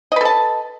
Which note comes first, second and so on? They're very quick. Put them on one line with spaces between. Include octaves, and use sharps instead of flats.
D#5 B4 A4 A5